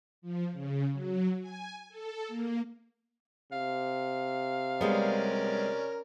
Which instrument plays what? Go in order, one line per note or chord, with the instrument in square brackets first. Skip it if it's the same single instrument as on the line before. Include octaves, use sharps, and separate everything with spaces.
[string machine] F3
C#3
F#3
G#5
A4
A#3
[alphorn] C3 [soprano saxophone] F5
[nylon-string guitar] G3 G#3 B3 [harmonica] C#4 A#4 D5